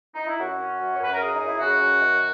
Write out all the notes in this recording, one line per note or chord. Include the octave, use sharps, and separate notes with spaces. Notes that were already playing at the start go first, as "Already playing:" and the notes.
D#4
E4
F#2 F#4
C#4
F#2
C#5
F#2 B4
A#4
C#3 G#4
D#4
F#2
E4
C#3 F#4
F#2
D#3